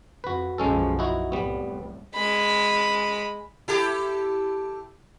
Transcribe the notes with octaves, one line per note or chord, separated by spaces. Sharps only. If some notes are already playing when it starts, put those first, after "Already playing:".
F2 F#4 B4
B1 F#2 F3 G#3 C#4 A4
D#4 E4 F#4
C2 A2 G3 B3
G#3 B5
E4 G4 A4